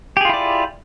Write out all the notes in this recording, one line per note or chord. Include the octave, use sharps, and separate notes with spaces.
E4 F4 G4 G#4 D5